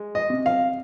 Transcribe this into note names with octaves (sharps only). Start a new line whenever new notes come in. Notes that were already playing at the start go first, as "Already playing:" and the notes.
Already playing: G#3
D#5
C3
F5